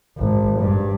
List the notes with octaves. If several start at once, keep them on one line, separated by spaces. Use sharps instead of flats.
G#1
G2